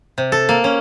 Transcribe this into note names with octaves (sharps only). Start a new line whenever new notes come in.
C3
A4
A#3
C#4